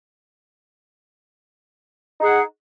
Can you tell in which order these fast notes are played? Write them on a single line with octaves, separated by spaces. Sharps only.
D#4 G#4 F#5